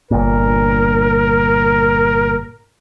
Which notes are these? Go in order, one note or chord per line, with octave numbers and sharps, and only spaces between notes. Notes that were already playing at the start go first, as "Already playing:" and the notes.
G1 A#2 A#4